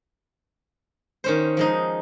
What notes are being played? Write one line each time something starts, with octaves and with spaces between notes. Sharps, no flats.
D#3 C#4 C5
F3 G#3 D#4